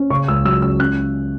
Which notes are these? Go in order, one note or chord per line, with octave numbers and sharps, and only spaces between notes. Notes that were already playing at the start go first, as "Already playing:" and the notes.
Already playing: C#4
C#3 C#6
C#2 E6
F#3 E6
C#2 E6
C#4 F#6